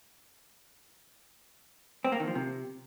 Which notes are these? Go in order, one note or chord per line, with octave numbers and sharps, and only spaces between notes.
C4
A#3
D#3
F3
C3